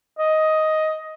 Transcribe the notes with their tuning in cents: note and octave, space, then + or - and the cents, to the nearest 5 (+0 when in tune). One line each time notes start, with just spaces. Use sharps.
D#5 +10